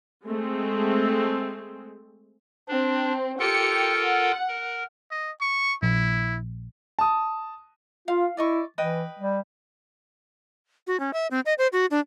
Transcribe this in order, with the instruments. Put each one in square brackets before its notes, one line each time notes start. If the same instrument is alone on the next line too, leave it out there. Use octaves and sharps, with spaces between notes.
[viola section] G#3 A3 C4
[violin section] C4 [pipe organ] D4
[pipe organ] F4 A4 A#4 [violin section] G4 G5 C#7
[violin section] F#5
[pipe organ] A#4
[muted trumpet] D#5
C#6
[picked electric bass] A#1 [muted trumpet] E4
[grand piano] A5 D#6
[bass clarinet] F4 [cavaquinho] F5
[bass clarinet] E4 [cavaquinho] D5 D#5 C#6
[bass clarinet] E3 [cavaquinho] B4 D#5 G5
[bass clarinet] G3
[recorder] F#4
C#4
E5
C4
D#5
C5
F#4
D4